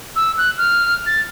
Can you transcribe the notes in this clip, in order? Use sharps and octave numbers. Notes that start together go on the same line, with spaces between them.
E6
F#6
F6
A6